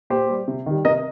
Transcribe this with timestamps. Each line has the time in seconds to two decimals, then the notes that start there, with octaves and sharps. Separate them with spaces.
0.10 A#2 G4 C5
0.29 G3
0.48 C3
0.66 D#3 G3
0.85 C3 A#4 D#5